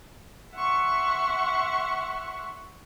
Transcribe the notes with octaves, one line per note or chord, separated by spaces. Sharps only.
E5 F#5 C6 C#6